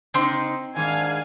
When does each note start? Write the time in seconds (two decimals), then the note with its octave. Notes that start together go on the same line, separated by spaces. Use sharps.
0.14 C#3 C4 D#4 C6
0.76 G#2 D#3 D4 F5 G#5